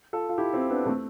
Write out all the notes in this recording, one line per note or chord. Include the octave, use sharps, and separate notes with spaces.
F4 A4
F4
E4 G4
C4 E4
B3 D4
A3 C4